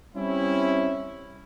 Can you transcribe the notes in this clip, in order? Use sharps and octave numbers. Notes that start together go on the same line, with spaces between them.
G3 C4 C#4 E4